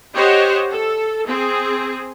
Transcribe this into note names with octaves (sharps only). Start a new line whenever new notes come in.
G4 C5 C#5 D#5 F#5
A4
C4 G#4